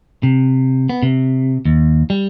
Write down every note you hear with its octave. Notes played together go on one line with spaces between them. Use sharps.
C3
B3
C3
D#2
G3